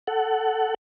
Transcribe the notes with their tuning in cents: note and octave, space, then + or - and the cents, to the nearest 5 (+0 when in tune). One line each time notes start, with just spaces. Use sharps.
A4 +0 F#5 +20